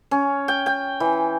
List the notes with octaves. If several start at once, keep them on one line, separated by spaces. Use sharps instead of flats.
C#4
G5
G5
E3